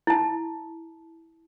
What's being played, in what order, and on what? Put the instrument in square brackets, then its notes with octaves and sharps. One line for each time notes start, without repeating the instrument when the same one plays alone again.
[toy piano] E4 A5